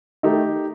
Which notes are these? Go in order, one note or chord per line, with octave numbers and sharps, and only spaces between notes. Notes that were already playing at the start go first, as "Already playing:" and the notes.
D#3 A3 D#4 G4